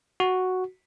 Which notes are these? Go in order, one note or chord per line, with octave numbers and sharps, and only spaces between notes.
F#4